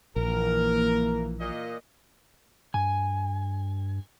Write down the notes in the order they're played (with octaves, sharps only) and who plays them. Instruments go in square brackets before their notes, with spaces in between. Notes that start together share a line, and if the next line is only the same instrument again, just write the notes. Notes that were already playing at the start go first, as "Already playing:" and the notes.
[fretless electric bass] A#1 [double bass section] E3 A#3 [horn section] A#4
[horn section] A#2 D#5
[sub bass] G2 [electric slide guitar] G#5